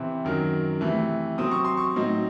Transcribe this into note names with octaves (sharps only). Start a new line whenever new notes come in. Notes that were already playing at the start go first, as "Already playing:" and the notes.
Already playing: C3 E3 C4 E4
F#2 D#3 F#3
C3 E3 A3
C3 F#3 C4 D#6
C#6
C6
C#6
A2 F#3 C4 D#4